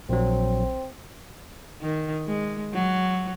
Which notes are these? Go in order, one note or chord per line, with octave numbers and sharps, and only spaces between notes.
A#1 F#3 C4
D#3
G#3
F#3